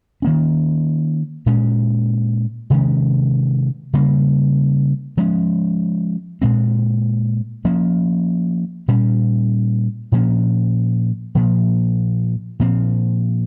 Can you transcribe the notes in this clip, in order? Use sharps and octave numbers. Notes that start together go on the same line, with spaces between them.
D#3 A#3 C#4
A#2 G#3 C#4
C3 D#3 G#3 C#4
C#3 G3 A#3
F3 G#3 C#4
A#2 G#3 C4
F3 A#3 C#4
A#2 G3 C#4
A#2 F3 A#3 C#4
A#2 F3 A#3
A#2 F3 C4